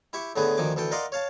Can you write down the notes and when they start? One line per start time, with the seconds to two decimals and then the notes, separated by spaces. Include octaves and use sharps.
0.13 E4 G4 E5 C#6
0.36 A2 D3 A3 B3 G#4 B4
0.57 D2 D#3 F3 G#5 D6
0.76 D2 E3 A4 G5
0.92 A#4 D5 D#5 F5 F#5 C6
1.12 C#5 F5 A5